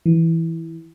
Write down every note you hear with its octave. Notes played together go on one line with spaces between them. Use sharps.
E3